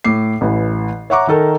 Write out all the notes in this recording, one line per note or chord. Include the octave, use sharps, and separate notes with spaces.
A2 D6 C7
A1 E3
C#5 E5 F#5 A#5 C#6 D6
D#3 D#4 A4 A#4